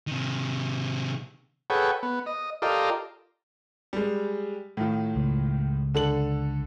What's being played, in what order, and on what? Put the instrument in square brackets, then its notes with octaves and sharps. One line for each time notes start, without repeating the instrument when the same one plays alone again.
[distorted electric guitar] C3 D#3
[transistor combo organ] G#4 A4 B4 C#5 F#5 G5
B3
D#5
F4 G4 A4 A#4 D5 D#5
[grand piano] G3 G#3
A2 D#3 F4
[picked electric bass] C#2
[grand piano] D3 A4 F#7